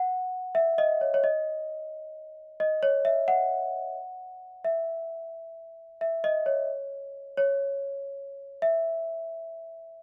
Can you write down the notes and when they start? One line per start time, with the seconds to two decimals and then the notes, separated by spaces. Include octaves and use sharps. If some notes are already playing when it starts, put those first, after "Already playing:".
Already playing: F#5
0.55 E5
0.78 D#5
1.01 C#5
1.14 C#5
1.24 D#5
2.60 D#5
2.83 C#5
3.05 E5
3.28 F#5
4.65 E5
6.01 E5
6.24 D#5
6.46 C#5
7.37 C#5
8.62 E5